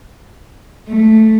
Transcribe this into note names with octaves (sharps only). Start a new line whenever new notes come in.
A3